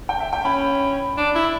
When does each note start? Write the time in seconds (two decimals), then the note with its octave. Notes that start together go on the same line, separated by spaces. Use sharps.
0.09 G5
0.20 E5
0.33 G5
0.45 C#4 B5
1.17 D4
1.35 E4 B5